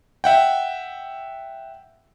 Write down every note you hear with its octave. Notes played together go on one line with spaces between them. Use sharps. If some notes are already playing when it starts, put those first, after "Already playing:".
E5 F#5 G5